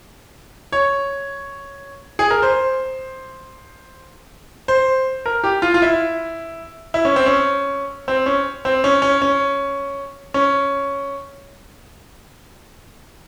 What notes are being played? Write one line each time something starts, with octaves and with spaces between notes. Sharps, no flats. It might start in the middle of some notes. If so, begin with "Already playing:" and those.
C#5
G#4
A#4
C5
C5
A#4
G4
F4
F4
E4
E4
C#4
C4
C#4
C4
C#4
C4
C#4
C#4
C#4
C#4